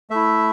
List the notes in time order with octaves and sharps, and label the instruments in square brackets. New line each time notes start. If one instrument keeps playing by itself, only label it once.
[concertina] A3 E4 E5